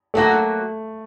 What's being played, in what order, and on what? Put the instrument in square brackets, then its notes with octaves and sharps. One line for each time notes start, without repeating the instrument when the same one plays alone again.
[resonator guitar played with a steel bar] F#3 A#3 F#4 [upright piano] A3